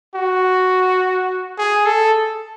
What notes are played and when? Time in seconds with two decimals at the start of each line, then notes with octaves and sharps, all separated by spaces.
0.15 F#4
1.58 G#4
1.86 A4